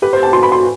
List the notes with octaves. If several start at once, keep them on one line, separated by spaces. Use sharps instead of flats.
G4 B4
C5
A5
F#4 C6
B5
C6